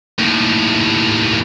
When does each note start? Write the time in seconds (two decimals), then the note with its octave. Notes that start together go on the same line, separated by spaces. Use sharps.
0.19 D#2 A2